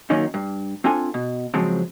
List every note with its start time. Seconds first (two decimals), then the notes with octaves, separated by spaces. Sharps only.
0.10 F#2 D#3 A#3 C#4 D#4
0.34 G2
0.84 C4 D4 F4 A4 G#5
1.14 B2
1.54 C#3 F3 F#3 G#3 C4